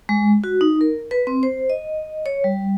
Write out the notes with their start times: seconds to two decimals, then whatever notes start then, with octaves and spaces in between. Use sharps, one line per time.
0.09 G#3
0.44 F#4
0.61 D#4
0.81 A#4
1.11 B4
1.27 C4
1.43 C5
1.70 D#5
2.26 C#5
2.44 G3